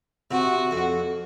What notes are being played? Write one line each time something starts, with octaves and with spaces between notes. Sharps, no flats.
C3 F#4
F2